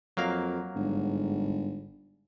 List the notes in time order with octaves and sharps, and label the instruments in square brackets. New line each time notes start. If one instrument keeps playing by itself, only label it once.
[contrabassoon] F2 [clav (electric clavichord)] F#3 A#3 F5
[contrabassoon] G1 [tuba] G#2